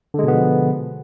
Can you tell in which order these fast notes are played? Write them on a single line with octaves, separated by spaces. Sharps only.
D3 G#3 B2 B3 F3